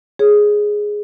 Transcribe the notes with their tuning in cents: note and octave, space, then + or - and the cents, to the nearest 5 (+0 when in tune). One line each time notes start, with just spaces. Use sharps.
G#4 +0 C#5 +0